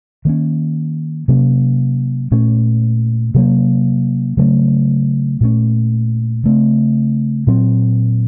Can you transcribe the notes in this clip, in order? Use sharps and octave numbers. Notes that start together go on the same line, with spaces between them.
D#3 A#3 C#4
C3 F#3 A#3 C#4
A#2 A3 C#4
C3 F#3 A#3
C#3 F#3 A3 C#4
A#2 A3 C#4
C#3 A3 C4
A#2 F#3 C4